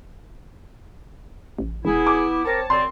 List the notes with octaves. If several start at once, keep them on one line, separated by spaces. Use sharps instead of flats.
A1
E1 B3 E4 G#4
D6
C4 A#4 C#5 A5
F#2 D#3 C4 D5 C6